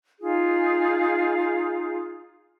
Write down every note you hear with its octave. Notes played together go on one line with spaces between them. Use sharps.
D#4 F4 G#4